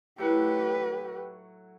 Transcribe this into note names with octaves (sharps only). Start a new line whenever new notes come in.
A2 F#3 G4 B4 F#5